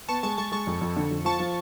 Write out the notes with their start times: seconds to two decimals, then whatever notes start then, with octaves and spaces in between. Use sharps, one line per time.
0.08 B3 A5 C#6
0.23 G#3 A5 C#6
0.37 G#3 A5 C#6
0.52 G#3 A5 C#6
0.67 F2
0.81 F2
0.97 D3
1.11 F2
1.25 F3 A5 C#6
1.39 F3